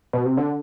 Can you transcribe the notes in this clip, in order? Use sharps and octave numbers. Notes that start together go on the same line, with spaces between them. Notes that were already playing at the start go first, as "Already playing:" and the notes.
B2
C3
D3